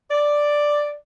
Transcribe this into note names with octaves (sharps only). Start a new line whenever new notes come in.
D5